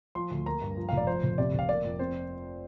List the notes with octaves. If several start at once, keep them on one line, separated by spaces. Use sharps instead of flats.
F3 C6
D2
A#3 A#5
G2
F3
F1 F5
D5
F3 C5
F1
C3 D5
F1
F5
A#3 D5
F2
C4 C5